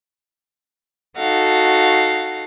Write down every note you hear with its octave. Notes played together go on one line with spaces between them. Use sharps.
D#4 F#4 A4 F5 F#5